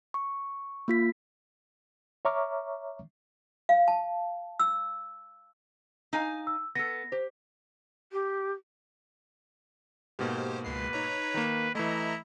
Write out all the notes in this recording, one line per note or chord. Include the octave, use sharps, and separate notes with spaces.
C#6
A#3 F4 B6
C#5 E5 A#5 C#6 D6 F6
F5
A5
E6
D#4 F5 G#5
E6
B3 A4 A#6
G4 C5
G4
G#2 B2 A#3 G4 C5
C#2 G#3 B4 C7
D#4 C#5 A#5
D#3 A#3
E3 A3 E4 D#5 A#5